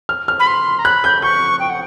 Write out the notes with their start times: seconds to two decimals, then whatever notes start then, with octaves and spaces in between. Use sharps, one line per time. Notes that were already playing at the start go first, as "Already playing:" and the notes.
0.09 F6
0.28 F6
0.40 B5
0.47 C6
0.79 A#5
0.85 B5 F#6
1.04 G6
1.22 C#6 G6
1.60 G5
1.70 F#5